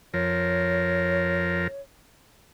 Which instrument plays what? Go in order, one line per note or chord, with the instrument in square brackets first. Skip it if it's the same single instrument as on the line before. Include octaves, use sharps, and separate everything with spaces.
[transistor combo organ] F2 F3 A#4 [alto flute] C#5